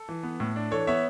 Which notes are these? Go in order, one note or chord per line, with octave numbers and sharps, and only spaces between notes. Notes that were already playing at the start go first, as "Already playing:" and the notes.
Already playing: A4
E3
B3
A2
D4
E3 A4 C#5
B3 C#5 E5